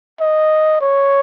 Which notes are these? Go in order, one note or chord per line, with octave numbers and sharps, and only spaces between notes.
D#5
C#5